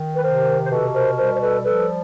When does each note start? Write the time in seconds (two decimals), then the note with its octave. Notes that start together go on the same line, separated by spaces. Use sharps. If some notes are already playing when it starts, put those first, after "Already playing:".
Already playing: D#3
0.15 B4
0.23 C3 A#4 C5
0.65 C5
0.70 B2 A4 B4
0.94 A#4 C5
1.17 G3 A#4 C5
1.35 C5
1.41 A4 B4
1.65 F3 A4 B4